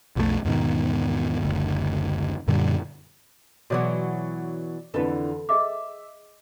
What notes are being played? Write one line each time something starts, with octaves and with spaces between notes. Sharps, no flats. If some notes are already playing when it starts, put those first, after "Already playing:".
B1 F2 F3 A3
E2 G#2 B2 D#3
F#1 D2
F#2 A#2 D3 G3
B2 E3 F#3 F#4 G#4 C#5 D5
F2 D3 E3 A4 B4
G#4 D#5 E5 D6